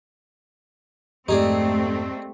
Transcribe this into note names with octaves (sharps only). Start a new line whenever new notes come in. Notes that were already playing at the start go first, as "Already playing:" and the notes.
F2 G#2 A3 C4 D#4 G4 G#4 D5